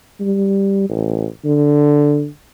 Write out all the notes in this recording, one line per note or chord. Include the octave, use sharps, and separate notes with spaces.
G3
A1
D3